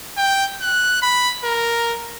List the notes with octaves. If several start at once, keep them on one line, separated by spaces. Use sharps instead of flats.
G5
F#6
B5
A#4